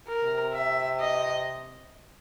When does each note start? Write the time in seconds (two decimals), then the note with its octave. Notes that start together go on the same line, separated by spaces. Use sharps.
0.08 A#4
0.23 C3
0.54 E5
1.00 D#5